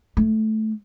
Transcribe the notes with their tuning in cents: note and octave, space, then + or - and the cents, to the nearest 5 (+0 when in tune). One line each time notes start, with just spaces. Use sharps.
A3 -10